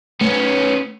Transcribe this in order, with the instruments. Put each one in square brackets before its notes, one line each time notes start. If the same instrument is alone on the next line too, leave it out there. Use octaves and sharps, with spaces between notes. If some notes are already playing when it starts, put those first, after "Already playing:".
[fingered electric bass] A3 [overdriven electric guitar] B3 C#4